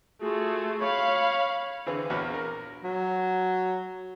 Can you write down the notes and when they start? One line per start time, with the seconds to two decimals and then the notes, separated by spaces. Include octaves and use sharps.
0.22 A3 F4 F#4 G#4
0.81 C#5 F5 B5 C#6
1.86 D3 E3 C4 G#4 B4
2.10 A#1 E2 F#4 C#5 F5 B5
2.34 A#4
2.84 F#3